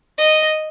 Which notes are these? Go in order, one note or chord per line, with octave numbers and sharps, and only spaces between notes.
D#5